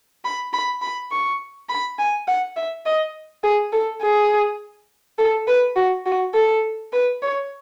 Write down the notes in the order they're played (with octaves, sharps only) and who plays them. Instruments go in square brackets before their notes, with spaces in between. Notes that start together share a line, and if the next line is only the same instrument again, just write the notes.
[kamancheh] B5
B5
B5
C#6
B5
G#5
F#5
E5
D#5
G#4
A4
G#4
A4
B4
F#4
F#4
A4
B4
C#5